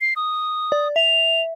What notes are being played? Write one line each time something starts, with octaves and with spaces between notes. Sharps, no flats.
C7
D#6
D5
E5 F7